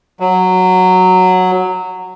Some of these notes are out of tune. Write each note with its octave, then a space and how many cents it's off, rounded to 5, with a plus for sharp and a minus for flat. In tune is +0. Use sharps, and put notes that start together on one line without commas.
F#3 -5